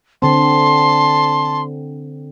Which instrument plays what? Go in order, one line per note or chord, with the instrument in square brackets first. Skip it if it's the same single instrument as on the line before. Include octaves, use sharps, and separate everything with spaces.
[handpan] D3 C4 [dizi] A5 [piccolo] C6